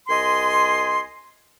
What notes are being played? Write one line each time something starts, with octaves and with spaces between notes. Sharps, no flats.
C2 D#5 G#5 C6